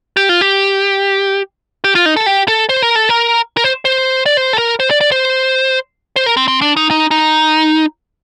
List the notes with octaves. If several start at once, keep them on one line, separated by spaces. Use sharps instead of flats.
G4
F4
G4
G4
F4
D#4
A4
G4
A4
C5
A#4
A4
A#4
A#4
C5
C5
D5
C5
A4
A#4
C5
D5
D5
C5
C5
A#4
C4
C4
D4
D#4
D#4
D#4